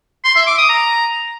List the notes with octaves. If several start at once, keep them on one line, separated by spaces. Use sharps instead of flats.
C6
E5
D6
D#6
A#5